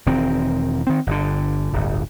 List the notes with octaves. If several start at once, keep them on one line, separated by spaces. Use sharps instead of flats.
E1 D#3 C4
D#3 C4
G1 D3
D1 G1